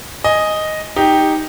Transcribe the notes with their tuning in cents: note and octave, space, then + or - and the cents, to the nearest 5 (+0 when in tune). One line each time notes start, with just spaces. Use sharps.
D#5 +0 G#5 +0
D#4 +0 G4 +0